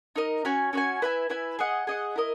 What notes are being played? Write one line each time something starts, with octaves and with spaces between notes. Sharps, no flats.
D#4 A#4 D#5
C#4 F#4 C#5 G#5
C#4 F#4 C#5 G#5
E4 B4 E5 G#5
E4 B4 E5 G#5
G#4 D#5 F#5
G#4 D#5 F#5
E4 A#4 D#5